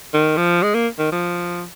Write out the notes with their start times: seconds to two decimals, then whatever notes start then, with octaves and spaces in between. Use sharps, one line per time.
0.14 D#3
0.37 F3
0.63 G#3
0.74 A#3
0.99 D#3
1.12 F3